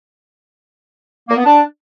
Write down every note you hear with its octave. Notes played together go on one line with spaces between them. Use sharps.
A#3
B3
D4